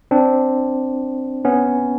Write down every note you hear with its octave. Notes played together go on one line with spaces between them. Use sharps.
C4 D4
B3 C#4